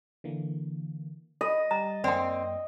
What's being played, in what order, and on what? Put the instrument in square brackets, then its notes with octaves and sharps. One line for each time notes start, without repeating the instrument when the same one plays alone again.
[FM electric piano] D3 E3 A#3
[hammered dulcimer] D#5 [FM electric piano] B5
[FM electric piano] G3 G4 A6 [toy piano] A#5
[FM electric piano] F#2 A#3 [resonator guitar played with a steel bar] C4 [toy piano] D5 G5